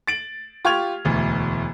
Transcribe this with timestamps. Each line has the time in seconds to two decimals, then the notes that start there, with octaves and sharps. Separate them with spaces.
0.07 A6 D7 F#7
0.65 F4 G4 C#6 F6 G#6 F7
1.05 E1 D2 E3